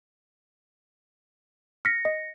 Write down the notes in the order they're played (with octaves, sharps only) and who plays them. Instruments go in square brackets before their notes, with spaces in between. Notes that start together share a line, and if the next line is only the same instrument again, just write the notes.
[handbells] F6 B6 [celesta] A#6 C#7
[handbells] D#5